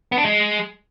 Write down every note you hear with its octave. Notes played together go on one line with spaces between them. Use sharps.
B3
D4
G#3